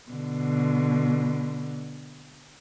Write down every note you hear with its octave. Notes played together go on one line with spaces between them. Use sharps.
B2 D3